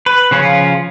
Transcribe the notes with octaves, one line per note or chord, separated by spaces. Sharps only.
B4
C#3 F3 C#4 F4